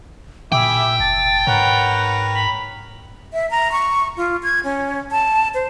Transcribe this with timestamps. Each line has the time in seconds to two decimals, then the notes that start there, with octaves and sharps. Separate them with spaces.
0.52 A#2 E4 G#4 E5 G5 D6
1.00 F1 A5 A6
1.47 G#2 A#4 B4 C#5 F#5
2.34 B5
3.34 E5
3.51 A#5
3.72 C#6
4.17 F4
4.43 G#6
4.64 C#4
5.11 A5
5.54 C5